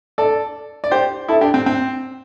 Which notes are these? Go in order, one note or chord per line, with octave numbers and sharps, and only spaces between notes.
A4 D5
D5
G4 C5
E4 A4
D4 G4
C4
C4